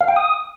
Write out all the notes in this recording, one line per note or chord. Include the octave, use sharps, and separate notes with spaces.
F5
G5
D#6